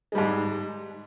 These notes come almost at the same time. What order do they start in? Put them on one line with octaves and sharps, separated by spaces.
G#3 G3 G#2